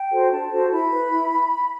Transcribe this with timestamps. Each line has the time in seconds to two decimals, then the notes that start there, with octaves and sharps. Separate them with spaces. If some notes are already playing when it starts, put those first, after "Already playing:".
Already playing: G5
0.11 F#4 A4 C5
0.31 D4 A5
0.51 F#4 A4 C5
0.71 E4 B5
0.91 B4
1.11 E4